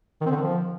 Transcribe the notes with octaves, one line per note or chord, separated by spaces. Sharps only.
D#3
C4
D3
D#3
F3